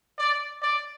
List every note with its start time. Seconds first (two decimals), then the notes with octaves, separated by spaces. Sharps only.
0.18 D5
0.62 D5